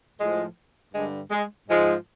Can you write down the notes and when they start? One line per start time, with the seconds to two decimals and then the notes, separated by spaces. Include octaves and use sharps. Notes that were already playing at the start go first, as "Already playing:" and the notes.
0.19 A2 F3 G#3
0.93 G2 D3 G3 G#3
1.31 G#3
1.68 G#2 F3 G#3